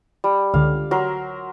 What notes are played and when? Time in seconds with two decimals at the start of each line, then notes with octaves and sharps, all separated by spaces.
0.24 G3
0.54 C#2 D3 F5
0.91 F#3 A#4 C6